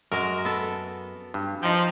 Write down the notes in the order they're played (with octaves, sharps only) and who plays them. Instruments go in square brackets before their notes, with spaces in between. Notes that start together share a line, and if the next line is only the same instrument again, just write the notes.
[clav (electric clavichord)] F#2 [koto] G#3 F#4 A#4
[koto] B3 A4
[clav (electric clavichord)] G2
[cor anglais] F3 [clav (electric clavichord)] D#4 G5